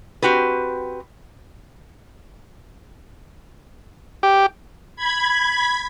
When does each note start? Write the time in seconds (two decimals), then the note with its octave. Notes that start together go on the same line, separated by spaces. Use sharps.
0.22 C4 F#4 G4 B4
4.23 G4
4.96 B5 G#6